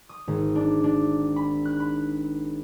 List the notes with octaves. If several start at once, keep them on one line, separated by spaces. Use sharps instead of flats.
D#6
G#1
D4
D4
B5
F#6
B5